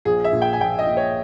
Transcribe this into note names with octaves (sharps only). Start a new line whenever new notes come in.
A#1 G#4
E5
A#2
G5
G#5
A#1 G5
D#5
A#2
C#5